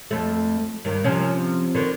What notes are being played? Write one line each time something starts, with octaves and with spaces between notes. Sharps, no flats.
F2 A3
G2 D#3
C3 F3 C#4
D3 D#3